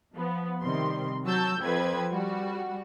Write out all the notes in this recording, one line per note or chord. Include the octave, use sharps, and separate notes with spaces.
F3 B3
C3 D#3 G3 C6
F#3 F#4 A5 E6 G6
F2 F3 C4 B4 G#6
G3 F#4